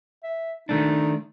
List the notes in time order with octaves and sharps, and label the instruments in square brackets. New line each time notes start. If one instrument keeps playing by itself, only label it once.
[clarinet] E5
[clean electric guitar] D#3 A3 D4 [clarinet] D#4